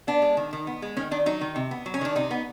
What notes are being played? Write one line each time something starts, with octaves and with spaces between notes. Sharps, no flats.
B3 D4
G#3
D#3
D#3
B3
G#3
D#3 C#4
D#3 D4
F#3 D#4
D#3
C3
B3
F#3
C#4
D#3 D4
C3 D#4
B3